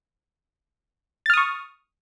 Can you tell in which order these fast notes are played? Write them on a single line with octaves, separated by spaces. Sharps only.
A6 F6 D#6 C#6